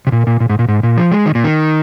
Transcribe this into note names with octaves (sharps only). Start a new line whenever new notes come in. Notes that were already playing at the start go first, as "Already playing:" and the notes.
C3
A#2
A#2
A#2
G#2
A#2
G#2
A#2
F3
G#3
D#3
A#2
D#3